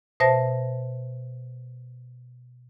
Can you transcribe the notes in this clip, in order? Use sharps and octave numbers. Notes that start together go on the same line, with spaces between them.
B2 C5 E5 A5 A#6